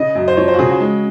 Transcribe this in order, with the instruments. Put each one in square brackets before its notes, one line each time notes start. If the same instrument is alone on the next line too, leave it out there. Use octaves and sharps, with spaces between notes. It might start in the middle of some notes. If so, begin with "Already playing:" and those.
Already playing: [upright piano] C#3 [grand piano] D#5
[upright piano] F#2
[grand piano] C5
[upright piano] F3 [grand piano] C#5
[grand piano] C5
F#4
[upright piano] C#3 [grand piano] G#4
[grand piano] F#4
[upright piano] G#3